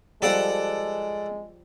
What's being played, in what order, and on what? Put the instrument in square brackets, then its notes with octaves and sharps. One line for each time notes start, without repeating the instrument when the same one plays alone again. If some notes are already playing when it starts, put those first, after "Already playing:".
[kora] F3 G3 [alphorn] G#3 [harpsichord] A4 D5 F#5